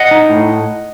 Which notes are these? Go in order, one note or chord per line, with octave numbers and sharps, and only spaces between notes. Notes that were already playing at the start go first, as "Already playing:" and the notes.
Already playing: D#5 F#5
D#4
A2